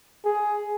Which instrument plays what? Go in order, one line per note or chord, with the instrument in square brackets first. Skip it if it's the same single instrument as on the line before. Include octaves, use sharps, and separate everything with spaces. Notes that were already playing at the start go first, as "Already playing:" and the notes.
[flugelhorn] G#4